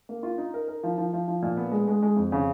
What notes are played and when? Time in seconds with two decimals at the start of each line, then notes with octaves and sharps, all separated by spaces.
0.09 A#3
0.23 F4
0.38 D#4
0.54 A#4
0.68 A#4
0.83 F3
0.98 F3
1.13 F3
1.28 F3
1.42 A#2
1.57 B3
1.72 G#3
1.88 G#3
2.02 G#3
2.16 F2
2.32 C#3